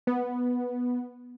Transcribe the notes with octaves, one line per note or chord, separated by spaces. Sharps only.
B3